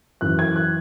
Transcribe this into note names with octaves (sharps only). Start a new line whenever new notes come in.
F#2 E3 F#6
G#6
F#6